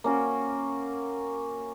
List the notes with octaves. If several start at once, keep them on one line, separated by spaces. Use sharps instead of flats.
A#3 C#4 F#4